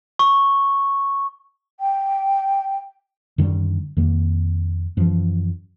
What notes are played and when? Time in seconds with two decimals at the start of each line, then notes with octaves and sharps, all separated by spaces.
0.19 C#6
1.80 G5
3.38 F#2 D3 D#3 G3
3.97 F2 D#3 A#3
4.97 F#2 E3 F3